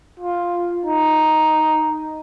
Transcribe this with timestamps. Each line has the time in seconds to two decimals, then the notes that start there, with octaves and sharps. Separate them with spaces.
0.20 F4
0.86 D#4